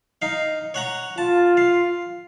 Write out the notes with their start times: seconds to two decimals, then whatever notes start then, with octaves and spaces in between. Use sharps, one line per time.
0.22 D#4 F5
0.74 C#5 F#5 A#5
1.18 F4 A5
1.57 F5